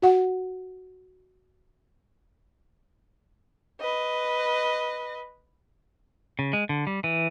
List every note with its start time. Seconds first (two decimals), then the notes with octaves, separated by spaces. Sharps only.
0.02 F#4 F#5
3.81 B4 D#5
6.39 C#3
6.53 G#3
6.69 D3
6.87 G3
7.04 E3